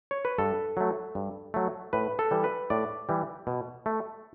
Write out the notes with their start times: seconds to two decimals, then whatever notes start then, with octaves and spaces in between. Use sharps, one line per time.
0.11 C#5
0.25 B4
0.38 G2 A4
0.77 F#3 A3
1.15 G2
1.54 F#3 A3
1.93 A2 B4
2.19 A4
2.31 E3 G3
2.44 B4
2.70 A2 D5
3.09 E3 G3
3.47 B2
3.86 A3